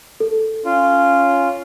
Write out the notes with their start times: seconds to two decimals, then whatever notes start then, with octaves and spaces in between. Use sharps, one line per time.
0.20 A4
0.65 C#4 F4